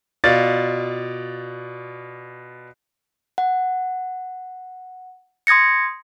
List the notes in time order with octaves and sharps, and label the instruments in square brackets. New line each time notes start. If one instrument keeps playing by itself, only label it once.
[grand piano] B2 F4 D5 A6
[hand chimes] F#5
C6 D#6 G#6 A#6 C#7